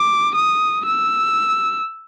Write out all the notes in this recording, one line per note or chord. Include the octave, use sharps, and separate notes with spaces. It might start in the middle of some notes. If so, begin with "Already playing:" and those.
Already playing: D6
D#6
E6